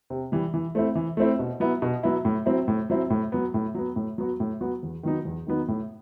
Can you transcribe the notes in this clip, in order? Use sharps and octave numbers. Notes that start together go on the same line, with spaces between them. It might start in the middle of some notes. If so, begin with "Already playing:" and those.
C3
E3 G3
E3
A3 C4 E4
E3
A3 C4 E4
B2
F#3 B3 E4
B2
F#3 B3 E4
A2
F#3 C4 E4
A2
F#3 C4 E4
A2
F#3 B3
A2
F#3 B3
A2
F#3 B3 F#4
A2
F#3 B3 F#4
E2
D#3 F#3 B3 D#4
E2
D#3 F#3 B3 D#4
A2